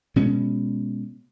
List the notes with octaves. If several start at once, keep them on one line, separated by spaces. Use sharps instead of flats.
B2 G#3 C#4